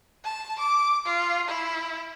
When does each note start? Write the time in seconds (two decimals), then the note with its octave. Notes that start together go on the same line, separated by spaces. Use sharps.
0.25 A5
0.59 D6
1.06 F4
1.48 E4